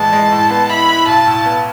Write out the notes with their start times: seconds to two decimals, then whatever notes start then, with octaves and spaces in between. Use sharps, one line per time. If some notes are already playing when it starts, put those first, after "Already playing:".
Already playing: A2 E3 G#3 A5
0.13 G#3
0.31 A2
0.50 B3
0.69 E4 B5
0.88 E4
1.07 B1 A5
1.26 A2
1.45 B3